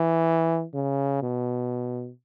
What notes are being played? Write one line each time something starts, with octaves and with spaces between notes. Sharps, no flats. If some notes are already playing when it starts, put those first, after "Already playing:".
Already playing: E3
C#3
B2